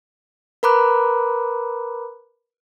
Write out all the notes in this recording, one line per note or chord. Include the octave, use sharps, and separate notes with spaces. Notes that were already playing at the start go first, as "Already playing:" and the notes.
A#4 B4 A#5 B5 D6 F#6